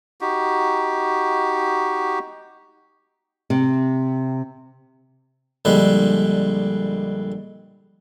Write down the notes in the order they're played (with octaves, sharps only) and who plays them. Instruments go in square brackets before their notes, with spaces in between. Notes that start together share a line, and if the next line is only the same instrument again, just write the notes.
[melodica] D#4 F#4 G4
[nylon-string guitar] C3
[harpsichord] A#1 D3 G3 G#3